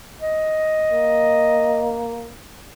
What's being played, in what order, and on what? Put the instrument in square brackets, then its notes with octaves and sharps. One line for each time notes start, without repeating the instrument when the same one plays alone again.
[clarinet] D#5
[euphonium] A#3